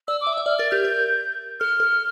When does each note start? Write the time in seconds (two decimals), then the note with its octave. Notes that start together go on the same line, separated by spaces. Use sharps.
0.08 D5 E6
0.21 D6
0.27 E5
0.33 E6
0.37 E5
0.46 D5 F6
0.59 A#4 A6
0.71 G4 G6
0.85 A#4
1.60 A4 F6
1.80 A4